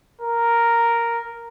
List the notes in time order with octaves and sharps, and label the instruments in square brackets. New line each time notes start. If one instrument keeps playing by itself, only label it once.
[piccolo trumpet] A#4